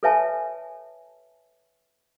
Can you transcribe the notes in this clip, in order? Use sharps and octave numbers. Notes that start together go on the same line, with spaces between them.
A4 B4 C#5 E5 G#5 A5